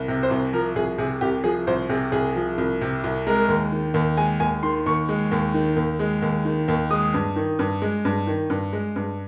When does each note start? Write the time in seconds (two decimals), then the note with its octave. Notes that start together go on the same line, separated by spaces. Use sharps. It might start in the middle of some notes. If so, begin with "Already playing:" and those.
Already playing: C2
0.08 C3
0.23 C5
0.31 C2
0.53 F3 A#4
0.75 C2 G#4
0.98 C3 G#4
1.21 C2 G4
1.44 F3 G#4
1.67 C2 C5
1.89 C3 G#4
2.12 C2 G#4
2.35 F3
2.58 C2
2.81 C3
3.04 C2
3.27 G#3 A#4
3.49 D#2
3.72 D#3
3.94 D#2
4.17 G#3 G#5
4.40 D#2 G#5
4.63 D#3 C6
4.86 D#2 C#6
5.09 G#3
5.31 D#2
5.54 D#3
5.76 D#2
5.99 G#3
6.22 D#2
6.45 D#3
6.68 D#2
6.91 G#3 D#6
7.14 G2
7.36 D#3
7.59 G2
7.82 G#3
8.05 G2
8.27 D#3
8.50 G2
8.73 G#3
8.96 G2